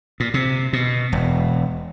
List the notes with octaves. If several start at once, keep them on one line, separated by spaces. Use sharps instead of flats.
A#2
C3
B2
E1